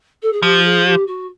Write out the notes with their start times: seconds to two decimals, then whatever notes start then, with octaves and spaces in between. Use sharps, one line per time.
0.22 A4
0.33 G#4
0.43 F3 G4
0.64 G#4
0.86 G4
1.07 F#4